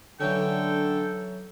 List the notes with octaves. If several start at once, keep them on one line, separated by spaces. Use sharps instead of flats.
D3 E3 F#3 C#4 A4 G5